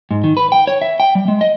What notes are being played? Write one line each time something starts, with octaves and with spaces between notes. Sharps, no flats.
G#2
D#3
B4
G5
C#5
E5
G5
G3
G#3
D#5